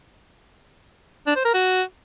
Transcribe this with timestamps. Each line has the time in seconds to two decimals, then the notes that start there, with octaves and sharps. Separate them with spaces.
1.27 D4
1.36 C5
1.45 A#4
1.54 F#4